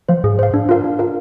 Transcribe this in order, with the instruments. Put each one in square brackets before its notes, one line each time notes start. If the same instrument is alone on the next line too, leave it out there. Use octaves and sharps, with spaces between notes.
[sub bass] F3 [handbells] C5 F5
[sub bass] G#2 [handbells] G#4
[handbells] C5 F5
D4
F4 A#4 F5
D4
F4 A#4 F5